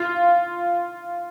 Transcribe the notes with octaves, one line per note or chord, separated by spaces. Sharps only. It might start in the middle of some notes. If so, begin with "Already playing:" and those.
Already playing: F4